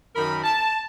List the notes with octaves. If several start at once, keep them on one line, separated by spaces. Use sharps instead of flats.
F#2 D#3 D#4 A#4 A#5 B5
A5